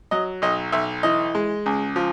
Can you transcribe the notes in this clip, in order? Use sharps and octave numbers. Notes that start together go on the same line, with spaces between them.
F#3 D#5
B1 D#5
B1 E5
E3 D#5
G#3
C#2
F3